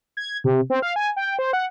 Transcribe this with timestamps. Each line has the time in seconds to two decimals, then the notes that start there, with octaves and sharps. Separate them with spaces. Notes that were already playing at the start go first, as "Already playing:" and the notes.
0.17 G#6
0.44 C3
0.70 C4
0.82 F5
0.96 G#5
1.16 G5
1.39 C5
1.53 F#5